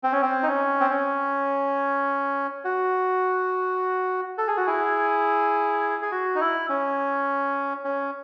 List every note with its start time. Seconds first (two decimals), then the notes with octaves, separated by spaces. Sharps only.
0.04 C4
0.13 C#4
0.22 C4
0.43 D#4
0.47 C#4
0.80 C4
0.91 C#4
2.64 F#4
4.38 A4
4.48 G#4
4.57 F#4
4.67 E4 G#4
6.02 G#4
6.12 F#4
6.35 D#4
6.40 E4
6.69 C#4
7.84 C#4